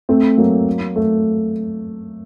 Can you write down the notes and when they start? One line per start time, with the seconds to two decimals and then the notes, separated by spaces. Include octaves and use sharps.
0.09 A3 C4
0.37 F#3 A#3
0.96 A3